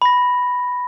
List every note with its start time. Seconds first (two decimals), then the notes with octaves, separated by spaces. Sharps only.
0.02 B5 A#6